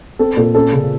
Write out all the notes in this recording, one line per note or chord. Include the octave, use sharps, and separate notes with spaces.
C4 A4
A#2 A4
C#4 A4
C#3